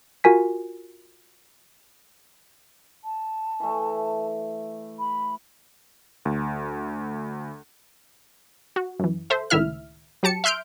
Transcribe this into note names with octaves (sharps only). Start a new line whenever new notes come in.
F4 F#4 A#4 G#5 B6
A5
E3 A3
B5
D2
F#4
F#2 E3
A4 C5 E5
C#2 A2 D#3 E4 E5 F6
F#3 G4 A5 C#7
E5 C6 F6 G6 D7